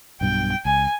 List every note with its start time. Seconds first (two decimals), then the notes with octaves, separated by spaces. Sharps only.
0.21 B1 G2 B2 G5
0.65 C#2 G#5